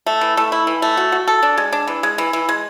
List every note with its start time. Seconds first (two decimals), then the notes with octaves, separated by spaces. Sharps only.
0.07 A3
0.21 E3
0.37 A3
0.52 E4
0.67 E3
0.82 A3
0.97 F#4
1.12 F#4
1.27 A4
1.43 D4
1.58 G#3
1.72 D4
1.87 E3
2.03 G#3
2.18 E3
2.33 E3
2.49 G#3